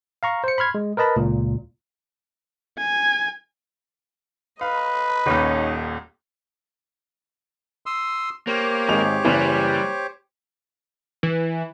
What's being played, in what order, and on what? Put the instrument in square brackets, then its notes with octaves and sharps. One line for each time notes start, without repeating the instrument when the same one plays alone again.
[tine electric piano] F5 A#5 C#6
C5 C#7
B5 C6 F6 G#6
G#3
A#4 B4 D#5 A5 B5
C#2 A#2
[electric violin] G#5
[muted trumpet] B4 [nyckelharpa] D#5 [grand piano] F5
[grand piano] D#1 D#2 [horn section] C#4 D#4
[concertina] C6 D#6 E6
[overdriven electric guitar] A#3 [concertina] G4 C5 C#5
[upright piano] G#1 G#3 F7
[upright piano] F#1 E3 [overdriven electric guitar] G3
[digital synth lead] E3